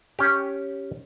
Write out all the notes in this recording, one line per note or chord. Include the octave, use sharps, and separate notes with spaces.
C#4 G4